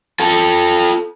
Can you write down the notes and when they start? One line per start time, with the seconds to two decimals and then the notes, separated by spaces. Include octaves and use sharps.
0.20 F4 A4